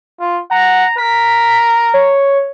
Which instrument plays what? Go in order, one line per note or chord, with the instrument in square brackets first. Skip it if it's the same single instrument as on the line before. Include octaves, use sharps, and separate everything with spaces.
[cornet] F4
[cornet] F#5 [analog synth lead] A#5
[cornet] A#4 [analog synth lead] B6
[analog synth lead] C#5